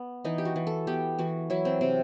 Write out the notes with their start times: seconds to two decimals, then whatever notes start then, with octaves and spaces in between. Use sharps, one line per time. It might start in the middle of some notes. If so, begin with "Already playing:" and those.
Already playing: B3
0.24 E3 D#4
0.38 G4
0.45 F#4
0.56 E3
0.67 A4
0.87 B3 G4
1.18 E3 F#4
1.50 F#3 E4
1.65 C4
1.81 C3 C4